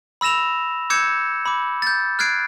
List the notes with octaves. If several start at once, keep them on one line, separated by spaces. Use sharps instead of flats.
B5 E6 A#6 E7 F7
D6 E6 G6 G#6 C#7 E7
B5 D6
G6 A6
F6 F#6 G#6 C7 D7